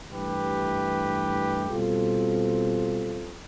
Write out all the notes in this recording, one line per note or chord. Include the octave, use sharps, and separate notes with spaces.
G2 E3 A3 G4 B4
B2 G3 C4 F4 A4